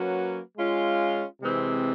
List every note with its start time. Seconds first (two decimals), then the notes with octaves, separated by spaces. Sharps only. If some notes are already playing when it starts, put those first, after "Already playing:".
Already playing: F#3 A#3 C#4 F#4 B4
0.57 G#3 C#4 F4
1.41 C3 E3 G#3 C4